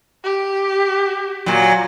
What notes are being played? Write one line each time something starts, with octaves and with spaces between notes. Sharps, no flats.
G4
A#2 F#3